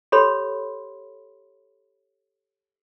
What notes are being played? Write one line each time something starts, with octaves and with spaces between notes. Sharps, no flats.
G4 A4 C#5 B5 C6